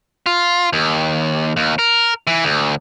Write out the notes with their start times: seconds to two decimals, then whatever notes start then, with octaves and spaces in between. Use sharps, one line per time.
0.26 F4
0.73 D#2
1.56 D#2
1.79 A#4
2.27 E3
2.44 D2